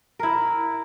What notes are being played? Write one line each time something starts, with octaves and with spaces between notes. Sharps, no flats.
E4 A#4